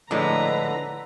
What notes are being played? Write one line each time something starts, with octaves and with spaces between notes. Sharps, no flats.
A#1 A2 D3 G#3 D4 B4 A#5